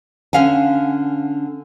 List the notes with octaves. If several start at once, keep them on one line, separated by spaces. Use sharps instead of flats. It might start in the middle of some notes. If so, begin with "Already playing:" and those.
D3 C#4 F5 F#5 G#5